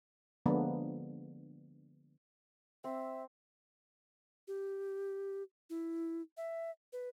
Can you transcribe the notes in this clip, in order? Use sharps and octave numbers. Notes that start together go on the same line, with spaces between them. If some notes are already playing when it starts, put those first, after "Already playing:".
D3 F3 G#3 A#3 B3 D4
C4 E5
G4
E4
E5
B4